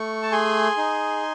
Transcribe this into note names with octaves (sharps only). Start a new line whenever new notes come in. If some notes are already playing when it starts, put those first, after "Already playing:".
Already playing: A3 C#6
A5
G#4 G#5 C6
D#4